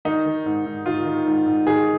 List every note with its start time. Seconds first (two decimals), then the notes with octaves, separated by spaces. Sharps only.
0.05 D#3 D#4
0.26 D#3
0.45 G#2
0.66 G#2
0.86 D#3 F4
1.06 D#3
1.26 G#2
1.46 G#2
1.67 D#3 G#4